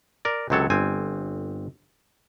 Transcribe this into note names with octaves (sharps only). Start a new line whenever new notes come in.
A#4 D5
C#2 C3 F#3 A4 C#5
G1 C4 G#5